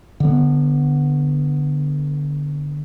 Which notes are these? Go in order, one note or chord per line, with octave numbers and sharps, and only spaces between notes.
D3 B3